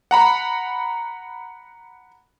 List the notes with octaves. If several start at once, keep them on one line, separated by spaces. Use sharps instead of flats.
F#5 A#5 B5